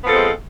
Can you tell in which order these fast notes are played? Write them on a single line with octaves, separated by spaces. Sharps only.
B3 F3 A4 C4 G#3